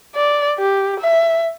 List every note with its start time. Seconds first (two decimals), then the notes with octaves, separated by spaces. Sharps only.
0.15 D5
0.58 G4
1.00 E5